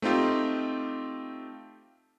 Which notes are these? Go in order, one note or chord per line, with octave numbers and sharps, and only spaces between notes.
A3 C4 D#4 F4 G4